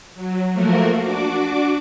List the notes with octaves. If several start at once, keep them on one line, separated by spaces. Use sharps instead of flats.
F#3
F3 A3 A#3 F#4 A#4
D4 F#4 D6